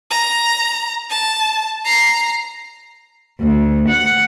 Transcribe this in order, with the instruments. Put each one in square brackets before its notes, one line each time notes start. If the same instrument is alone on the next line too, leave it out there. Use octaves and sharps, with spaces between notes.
[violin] A#5
A5
A#5 C7
[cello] D2
F#5